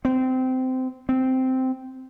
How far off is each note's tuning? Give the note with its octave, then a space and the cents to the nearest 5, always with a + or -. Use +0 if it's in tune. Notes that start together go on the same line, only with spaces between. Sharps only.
C4 -20
C4 -10